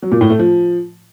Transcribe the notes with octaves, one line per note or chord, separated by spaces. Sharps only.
F#3
A#2
A2
A3
F3